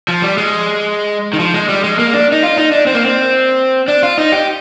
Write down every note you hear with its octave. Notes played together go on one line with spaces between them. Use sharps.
F3
G3
G#3
D#3
F3
G#3
G3
G#3
A#3
D4
D#4
F4
D#4
D4
C4
A#3
C4
D4
F4
D#4
G4